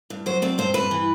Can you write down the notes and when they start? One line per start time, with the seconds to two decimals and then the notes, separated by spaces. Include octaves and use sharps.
0.10 G2
0.26 F#3 C5
0.42 C4 D5
0.58 G2 C5
0.74 G2 B4
0.91 E3